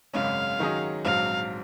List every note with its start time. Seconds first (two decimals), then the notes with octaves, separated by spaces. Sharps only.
0.14 G#1 F#2 C#3 G#3 C#4 F5
0.59 D#3 F#3 C#4 G#4 D#5
1.05 A#1 G#2 F#3 C4 F5